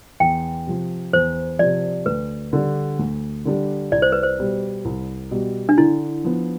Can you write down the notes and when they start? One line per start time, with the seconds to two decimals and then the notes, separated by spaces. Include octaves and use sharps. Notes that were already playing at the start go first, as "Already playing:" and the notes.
0.20 E2 G5
0.67 C3 F3
1.13 E2 C5
1.59 C3 F3 D5
2.06 D2 B4
2.53 D3 G3 D4
2.99 D2
3.45 D3 G3 D4
3.92 C2 D5
4.02 C5
4.12 B4
4.23 C5
4.39 B2 G3
4.85 C2
5.31 B2 G3
5.69 D4
5.78 D3 E4
6.24 F3 B3